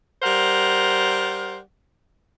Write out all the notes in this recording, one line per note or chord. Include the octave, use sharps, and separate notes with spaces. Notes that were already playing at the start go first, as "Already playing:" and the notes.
G3 A#4 C5 F#5